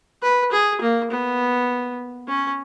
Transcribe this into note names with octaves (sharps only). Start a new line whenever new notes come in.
B4
G#4
A#3
B3
C#4